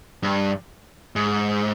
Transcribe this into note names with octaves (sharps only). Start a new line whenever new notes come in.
G2
G#2